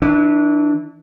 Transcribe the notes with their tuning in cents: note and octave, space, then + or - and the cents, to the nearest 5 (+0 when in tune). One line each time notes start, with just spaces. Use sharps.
E3 -25 D4 +10